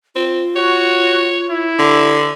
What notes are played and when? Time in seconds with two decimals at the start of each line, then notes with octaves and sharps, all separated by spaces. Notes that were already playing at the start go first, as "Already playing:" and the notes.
0.16 C4 F4
0.56 F#4 C#5
1.50 E4
1.79 D3